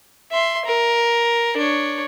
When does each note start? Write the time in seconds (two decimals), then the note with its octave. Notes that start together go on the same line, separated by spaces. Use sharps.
0.31 E5 C6
0.65 A#4
1.57 D4 C#5